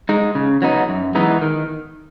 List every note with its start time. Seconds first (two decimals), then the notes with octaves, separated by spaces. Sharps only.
0.09 G#3 D#4
0.35 C#3
0.62 F#3 B3 D#4
0.89 F#2
1.15 E3 G#3 B3 D#4
1.41 D#3